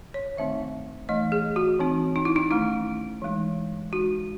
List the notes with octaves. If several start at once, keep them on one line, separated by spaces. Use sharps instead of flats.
C#5
D#3 A3 C4 D#4 E5
E3 A3 D#4 D#5
G#4
F#4
E3 C4 D#4
D#4
E4
D#4
D#3 A3 C#4 E4
E3 G#3 D#4
G#3 D#4 F#4